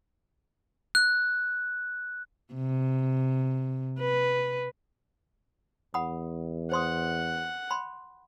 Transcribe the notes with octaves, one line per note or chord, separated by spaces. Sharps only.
F#6
C3
B4
E2 F#5 B5 D#6
C5 F#5 C6 D#6
B5 C6